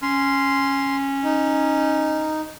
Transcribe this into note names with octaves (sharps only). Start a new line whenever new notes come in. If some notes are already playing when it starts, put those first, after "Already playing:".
C#4 C6
D#4